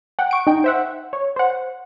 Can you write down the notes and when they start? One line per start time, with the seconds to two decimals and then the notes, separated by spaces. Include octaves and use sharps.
0.19 F#5 G5
0.31 C#6 D7
0.47 D#4 G5
0.64 C5 E5 F#5
1.13 C#5
1.36 C5 F#5